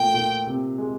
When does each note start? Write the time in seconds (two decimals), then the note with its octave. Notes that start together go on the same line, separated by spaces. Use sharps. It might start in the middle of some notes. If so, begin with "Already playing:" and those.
Already playing: A#2 F3 A3 G5
0.14 A#2
0.47 C3
0.78 G#3